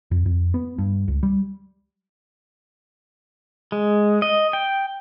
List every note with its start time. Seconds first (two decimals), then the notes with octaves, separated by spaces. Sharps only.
0.11 F2
0.26 F2
0.54 B3
0.78 G2
1.08 C#2
1.23 G3
3.72 G#3
4.22 D#5
4.53 G5